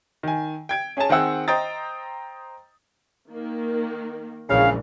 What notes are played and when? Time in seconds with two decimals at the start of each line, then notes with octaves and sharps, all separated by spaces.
0.23 D#3 G#5
0.69 G5 G#6 D7
0.97 C#4 G#4 C#5 G#5 A5
1.09 D#3 C4 G#4 F#5 E6
1.48 C5 D#5 G5 A#5 D#6 A6
3.31 D#3 A#3
4.49 A#1 C#3 E3 G#3 F5